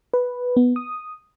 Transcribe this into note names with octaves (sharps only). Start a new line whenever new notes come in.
B4
B3
D#6